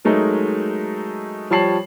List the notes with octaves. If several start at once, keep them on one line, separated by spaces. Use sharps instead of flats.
F#3 G#3 A3 D#4 A#4
F3 G3 C#5 A5 C7 F#7